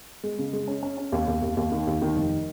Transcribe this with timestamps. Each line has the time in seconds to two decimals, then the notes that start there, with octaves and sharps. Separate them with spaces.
0.24 G#3
0.38 C#3
0.53 G#3
0.68 C#4
0.83 C#4
0.98 C#4
1.12 D#2
1.28 D#2
1.42 D#2
1.57 D#2
1.72 D#3
1.87 D#2
2.02 D#3
2.16 F1